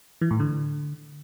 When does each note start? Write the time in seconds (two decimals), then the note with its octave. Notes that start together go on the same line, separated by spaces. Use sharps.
0.21 E3
0.31 A2
0.40 D3